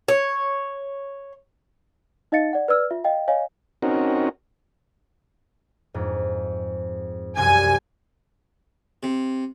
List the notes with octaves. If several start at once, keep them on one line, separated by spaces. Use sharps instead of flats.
C#5
D#4 D#5 F5 A6 C#7
D5 F#5
B4 D5 E6 F6
F4 E5
D#5 F5 G5
C#5 D#5 F5 G#5
C4 C#4 D#4 F#4 A#4
F2 G#2
C2 F#2 F3 G#5
C3